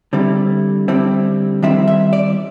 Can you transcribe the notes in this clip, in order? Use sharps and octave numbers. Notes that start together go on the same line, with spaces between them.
D3 G3 C4 E4
D3 G3 C4 E4
D#3 G3 C4 E4 E5
E5
D5